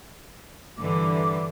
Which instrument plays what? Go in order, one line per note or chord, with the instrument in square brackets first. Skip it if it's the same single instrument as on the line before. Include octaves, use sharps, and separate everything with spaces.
[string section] G2 D3 E3 [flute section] D6